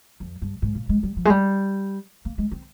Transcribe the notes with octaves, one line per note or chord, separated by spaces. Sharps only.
F2
G2
G#2
A#2
G#3
G3
F3
G#3
G3
A#3
G#3
C4